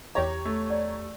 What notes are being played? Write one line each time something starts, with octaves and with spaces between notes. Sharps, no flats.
E2 G4 C#5 A#5
A3
D5